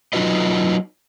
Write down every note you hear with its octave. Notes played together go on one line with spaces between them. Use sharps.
F#3 D#4 F4 F#4 B4 D#5